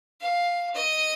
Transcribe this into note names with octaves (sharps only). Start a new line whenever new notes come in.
F5
D#5